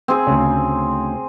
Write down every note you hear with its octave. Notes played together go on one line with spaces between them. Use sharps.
C4 G#4
D2 C#3